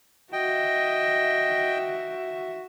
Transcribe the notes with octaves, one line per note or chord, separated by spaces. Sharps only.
F#4 D#5 E5 G5